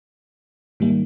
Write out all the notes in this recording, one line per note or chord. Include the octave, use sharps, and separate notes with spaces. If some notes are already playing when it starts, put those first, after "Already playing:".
G#2 D#3 G3 A#3